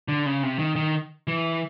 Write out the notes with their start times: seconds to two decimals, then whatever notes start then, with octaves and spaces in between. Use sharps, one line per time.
0.08 D3
0.26 C#3
0.43 C3
0.59 D#3
0.76 D#3
1.27 E3